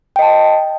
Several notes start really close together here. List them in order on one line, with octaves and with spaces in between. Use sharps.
G5 D#5 A5